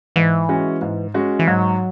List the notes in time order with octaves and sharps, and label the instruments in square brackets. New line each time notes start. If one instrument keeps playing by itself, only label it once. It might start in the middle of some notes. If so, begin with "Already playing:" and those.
[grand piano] G#2 [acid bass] E3
[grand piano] G#3 C#4 F#4
G#2
G#3 C#4 F#4
[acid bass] E3
[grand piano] G#2 [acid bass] F#3